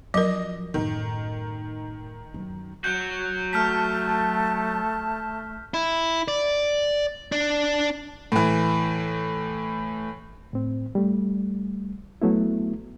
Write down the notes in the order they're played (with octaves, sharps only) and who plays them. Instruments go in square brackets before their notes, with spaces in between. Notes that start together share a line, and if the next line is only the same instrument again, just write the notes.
[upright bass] F#2 F3 [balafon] F#3 A#4 [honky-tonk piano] D#5
[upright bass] F#2 A2 [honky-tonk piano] D#3
[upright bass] F#2
[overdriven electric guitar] F#3 F#4 [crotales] G6
[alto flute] A3 [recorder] A5 [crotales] F6 G6 B6
[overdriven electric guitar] E4
D5
D4
[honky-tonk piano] A2 E3
[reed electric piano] A2 C4
G3 A3
F#3 A3 B3 E4